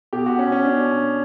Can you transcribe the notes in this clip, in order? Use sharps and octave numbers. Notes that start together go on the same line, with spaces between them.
B2 G4
F#4
C#4
C#4
B2 D4